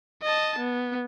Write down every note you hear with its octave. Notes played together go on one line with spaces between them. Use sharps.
D#5 A5
B3